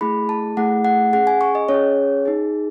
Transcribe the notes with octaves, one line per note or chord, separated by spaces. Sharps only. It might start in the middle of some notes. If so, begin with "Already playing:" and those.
A3 E4 G#4 B5
A5
A3 E4 G#4 F#5
F#5
C#4 G#4 F#5
G#5
C#6
D#5
C#4 C#5
G#4
D#4 G#4